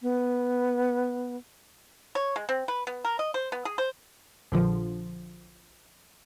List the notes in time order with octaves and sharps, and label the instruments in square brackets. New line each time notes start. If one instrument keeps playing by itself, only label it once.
[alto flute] B3
[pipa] C#5
G#3
C4
B4
B3
A#4
D#5
C5
B3
G#4
C5
[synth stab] A#1 D3 F3